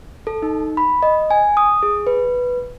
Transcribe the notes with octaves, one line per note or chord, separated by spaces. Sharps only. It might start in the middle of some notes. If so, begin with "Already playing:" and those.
A4
D#4
B5
D#5
G#5
D#6
G#4
B4